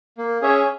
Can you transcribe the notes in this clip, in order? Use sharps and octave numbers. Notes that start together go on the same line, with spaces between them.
A#3
C#4 G#4 C#5 E5